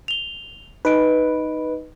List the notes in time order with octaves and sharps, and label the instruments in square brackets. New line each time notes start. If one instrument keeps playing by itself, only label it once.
[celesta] F7 G7
[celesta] D#4 D#5 D7 [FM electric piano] B4